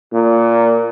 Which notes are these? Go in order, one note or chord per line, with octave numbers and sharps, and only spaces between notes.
A#2